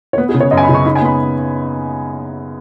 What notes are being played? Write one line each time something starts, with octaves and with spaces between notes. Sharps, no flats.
C#5
B3 B4
G#4
C#3
C#5
F#2 D#5
G#5
B5
C#3
C#6
D#4 B5
G#5
B3 B5